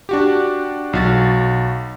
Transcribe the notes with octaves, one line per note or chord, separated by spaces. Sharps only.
D4 F#4 G4
B1 F#4 A6